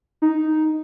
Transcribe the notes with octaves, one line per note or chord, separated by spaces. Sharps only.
D#4